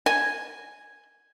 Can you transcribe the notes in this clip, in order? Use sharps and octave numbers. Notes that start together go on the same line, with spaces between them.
G#5